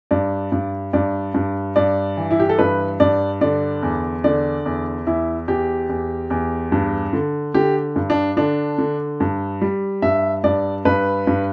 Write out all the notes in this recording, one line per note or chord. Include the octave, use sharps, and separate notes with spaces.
G2 D5
G2
G2 D5
G2
G2 D5
E3
E4
G4
A4
G2 B4
G2 D5
D3 D5
E2
D3 D5
E2
E2 E4
E2 G4
E2
E2
G2
D3
D3 G4
G2
D4
D3 D4
D3
G2
G3
G2 E5
G2 D5
G2 B4
G2